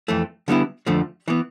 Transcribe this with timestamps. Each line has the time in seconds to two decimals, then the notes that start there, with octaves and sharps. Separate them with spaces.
0.08 F2 E3 A3
0.48 D3 G3 B3 E4
0.86 F2 D3 F3 A3
1.28 E3 B3